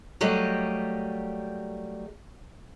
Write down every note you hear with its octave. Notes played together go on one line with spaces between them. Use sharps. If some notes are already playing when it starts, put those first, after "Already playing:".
F#3 G3 A3 A#3 G4 D#5